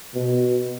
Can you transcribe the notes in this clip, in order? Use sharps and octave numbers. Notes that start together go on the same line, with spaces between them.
B2